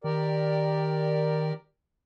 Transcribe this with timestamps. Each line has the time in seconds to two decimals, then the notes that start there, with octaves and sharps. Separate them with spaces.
0.04 D#3 G4 A#4 D5